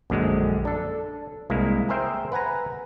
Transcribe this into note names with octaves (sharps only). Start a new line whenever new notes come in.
A#1 F#2 D3 G#3
D4 A4
C2 G#3 A#3 E4
G#4 A#4 C5 E5 G5
B4 F#5 G#5 A#5